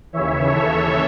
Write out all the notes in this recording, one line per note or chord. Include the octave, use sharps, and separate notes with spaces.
D#2 C#3 E3 C#5 E5
A4 C#5